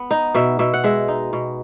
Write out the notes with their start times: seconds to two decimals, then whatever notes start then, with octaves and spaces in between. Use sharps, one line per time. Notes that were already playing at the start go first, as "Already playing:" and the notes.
Already playing: B3
0.11 D#4
0.34 B2 E5
0.59 B2 E5
0.74 F#5
0.84 G#3 E5
1.08 D#4
1.33 B2